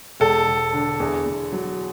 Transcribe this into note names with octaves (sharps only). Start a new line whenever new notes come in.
E1 A4
E1
D3
E2
E2
F#3